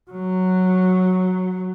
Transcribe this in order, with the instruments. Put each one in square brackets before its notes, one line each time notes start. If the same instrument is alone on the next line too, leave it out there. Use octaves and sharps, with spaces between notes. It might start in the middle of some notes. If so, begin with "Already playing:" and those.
[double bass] F#3